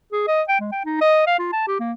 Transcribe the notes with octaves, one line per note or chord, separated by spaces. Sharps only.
G#4
D#5
G5
G#3
G5
D#4
D#5
F5
F4
A5
G4
A#3